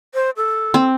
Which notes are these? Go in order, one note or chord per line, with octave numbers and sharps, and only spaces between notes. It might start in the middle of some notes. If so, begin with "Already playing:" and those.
C5
A4
C4